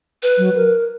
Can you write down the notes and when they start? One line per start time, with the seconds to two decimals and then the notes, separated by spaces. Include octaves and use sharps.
0.23 B4
0.38 F#3
0.55 A#4